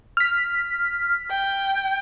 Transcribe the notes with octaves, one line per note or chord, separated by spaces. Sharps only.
F6 B6
G5